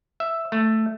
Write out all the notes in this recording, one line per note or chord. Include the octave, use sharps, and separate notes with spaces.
E5
A3